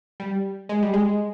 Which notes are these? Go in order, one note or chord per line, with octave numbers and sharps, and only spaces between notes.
G3
G#3
G3
G#3